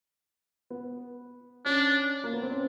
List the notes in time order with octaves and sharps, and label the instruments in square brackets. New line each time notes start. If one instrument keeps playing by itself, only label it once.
[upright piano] B3
[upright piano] C#4 [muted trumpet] D4
[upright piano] A#3
B3
C4
C#4